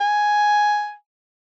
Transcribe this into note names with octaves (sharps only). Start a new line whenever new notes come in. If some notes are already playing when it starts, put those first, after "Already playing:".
G#5